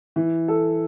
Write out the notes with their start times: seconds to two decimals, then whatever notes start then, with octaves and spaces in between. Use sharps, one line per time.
0.16 E3
0.48 A4